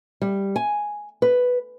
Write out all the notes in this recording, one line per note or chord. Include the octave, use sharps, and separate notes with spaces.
G3
G#5
B4